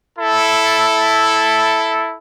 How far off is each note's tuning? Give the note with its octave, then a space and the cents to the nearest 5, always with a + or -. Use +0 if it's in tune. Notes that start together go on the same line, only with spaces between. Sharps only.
E4 +0 A4 -5